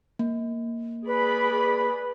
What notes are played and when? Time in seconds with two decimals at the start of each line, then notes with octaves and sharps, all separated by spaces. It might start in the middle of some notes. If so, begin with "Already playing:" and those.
0.19 A#3
1.07 G#4 B4 D5 B5